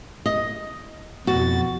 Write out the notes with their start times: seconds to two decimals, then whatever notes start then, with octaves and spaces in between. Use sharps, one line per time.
0.26 D#5
1.27 F2 B2 F#4 A6